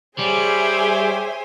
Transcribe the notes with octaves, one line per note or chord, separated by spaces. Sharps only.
G3 G#4 C5 C#5 E5 G#5 D6